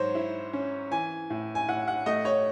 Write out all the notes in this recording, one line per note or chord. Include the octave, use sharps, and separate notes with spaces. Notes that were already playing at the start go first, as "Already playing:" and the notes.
Already playing: G#2 F#3 C5 C#5
E4
C#4
E3 G#5
A2
G#5
A2 F#5
F#5
A3 D#5
C#5